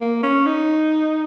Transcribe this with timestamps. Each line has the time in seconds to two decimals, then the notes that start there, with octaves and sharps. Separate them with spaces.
0.01 A#3
0.23 C#4
0.46 D#4